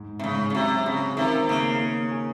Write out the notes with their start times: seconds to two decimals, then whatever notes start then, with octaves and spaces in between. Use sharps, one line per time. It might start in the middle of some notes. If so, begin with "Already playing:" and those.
Already playing: G#2
0.19 C3
0.24 G#2 C#3
0.50 C#3
0.55 C3 F#3
0.86 C#3 C4
1.17 C3 D#3
1.49 C#3 A#3
1.80 A#3
2.11 G#4